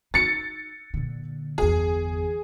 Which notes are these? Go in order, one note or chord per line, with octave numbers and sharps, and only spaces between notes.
D#4 A6 C#7
A#2 D3
G1 E2 G#4